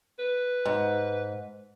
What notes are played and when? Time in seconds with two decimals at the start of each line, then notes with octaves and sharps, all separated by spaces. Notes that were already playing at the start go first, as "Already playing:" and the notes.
0.19 B4
0.65 G#2